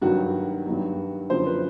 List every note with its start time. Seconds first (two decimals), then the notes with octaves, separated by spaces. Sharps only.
0.02 G2 D#3 F#3 F#4
0.66 G2 D#3 F#3
1.30 F#2 D3 F3 C5
1.47 B4